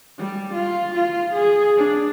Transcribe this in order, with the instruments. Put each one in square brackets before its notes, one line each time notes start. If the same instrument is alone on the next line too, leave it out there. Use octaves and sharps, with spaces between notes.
[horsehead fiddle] G3
F4
F4
G#4
D4